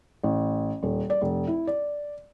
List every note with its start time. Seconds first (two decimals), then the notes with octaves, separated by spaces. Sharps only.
0.23 A1
0.83 D#1
1.10 D5
1.21 F1
1.47 E4
1.67 D5